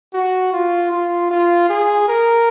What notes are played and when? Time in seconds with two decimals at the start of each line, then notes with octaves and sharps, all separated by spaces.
0.13 F#4
0.53 F4
0.91 F4
1.31 F4
1.69 G#4
2.08 A#4